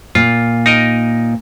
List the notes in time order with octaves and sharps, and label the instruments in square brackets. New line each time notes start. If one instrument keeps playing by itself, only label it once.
[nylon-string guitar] A#2 [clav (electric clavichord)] F4
[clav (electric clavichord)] D#4 A#4 D#5